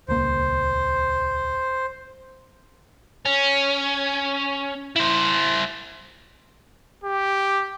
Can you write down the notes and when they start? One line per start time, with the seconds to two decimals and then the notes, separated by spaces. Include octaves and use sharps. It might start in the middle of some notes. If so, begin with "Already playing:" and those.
0.08 D#1 C#2 A#3 C5
3.26 C#4
4.96 E4 C5
7.04 G4